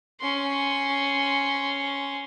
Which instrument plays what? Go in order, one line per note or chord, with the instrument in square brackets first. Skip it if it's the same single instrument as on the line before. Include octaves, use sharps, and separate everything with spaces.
[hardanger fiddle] C#4 C6